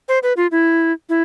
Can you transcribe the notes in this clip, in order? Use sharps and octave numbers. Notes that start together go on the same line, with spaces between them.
C5
B4
F4
E4
E4